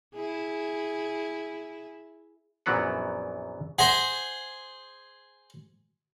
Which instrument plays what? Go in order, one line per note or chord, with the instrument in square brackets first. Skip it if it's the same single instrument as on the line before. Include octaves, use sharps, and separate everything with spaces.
[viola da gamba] E4 G#4
[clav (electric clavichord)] A#1 F#2 E3 F#3 B3 F#5
[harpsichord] G#4 C5 [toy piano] E5 F#5